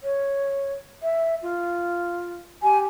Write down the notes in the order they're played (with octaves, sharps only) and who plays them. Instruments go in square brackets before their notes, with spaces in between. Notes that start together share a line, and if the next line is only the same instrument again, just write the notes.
[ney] C#5
E5
F4
[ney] G4 [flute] G#5